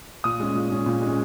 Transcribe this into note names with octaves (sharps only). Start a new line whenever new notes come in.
A#2 D#6
G#3 C#4
A#2
G#3 C#4
A#2
G#3 C#4